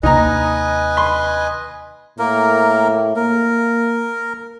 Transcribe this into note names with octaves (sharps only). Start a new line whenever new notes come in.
D#2 C3 D#4 B4 D#5 G#5 A#5
B5 C6
A2 A#3 A#4
A#3 A#4